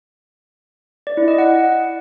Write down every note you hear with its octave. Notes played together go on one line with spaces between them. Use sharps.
D5
E4
D#5
F#5